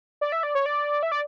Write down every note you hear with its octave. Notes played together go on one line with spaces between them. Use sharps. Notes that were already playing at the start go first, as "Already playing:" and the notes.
D5
E5
D5
C#5
D5
E5
D5